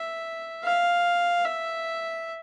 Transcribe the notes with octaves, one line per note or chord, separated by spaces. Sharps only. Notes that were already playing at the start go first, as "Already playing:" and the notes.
Already playing: E5
F5
E5